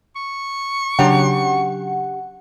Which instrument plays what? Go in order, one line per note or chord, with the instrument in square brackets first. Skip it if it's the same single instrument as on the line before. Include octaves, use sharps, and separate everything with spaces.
[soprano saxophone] C#6
[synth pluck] C#3 F#3 [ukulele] D4 G4 A#5 [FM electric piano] F#5